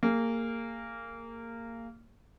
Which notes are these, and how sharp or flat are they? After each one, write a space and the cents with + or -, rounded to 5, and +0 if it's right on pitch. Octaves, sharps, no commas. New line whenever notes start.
A#3 -20 G#4 -25